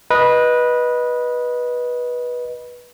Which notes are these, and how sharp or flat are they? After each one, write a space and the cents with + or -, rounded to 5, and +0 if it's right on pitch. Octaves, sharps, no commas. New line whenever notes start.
B4 -15 D#5 +0